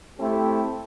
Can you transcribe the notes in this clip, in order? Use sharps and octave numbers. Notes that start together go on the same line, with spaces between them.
A3 C4 E4 G4 A4